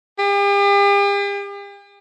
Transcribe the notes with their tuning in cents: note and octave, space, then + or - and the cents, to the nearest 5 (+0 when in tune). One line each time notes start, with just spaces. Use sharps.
G4 +45